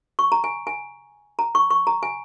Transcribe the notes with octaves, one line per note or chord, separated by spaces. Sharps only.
C#6
A#5
G#5
G#5
A#5
C#6
C#6
A#5
G#5